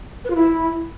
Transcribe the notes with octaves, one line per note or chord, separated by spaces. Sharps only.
B4
F4
E4